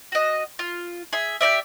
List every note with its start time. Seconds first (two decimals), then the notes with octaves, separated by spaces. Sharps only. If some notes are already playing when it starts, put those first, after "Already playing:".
0.12 F#4 D#5
0.59 F4
1.13 G#4 E5
1.41 G4 A#4 D5 E5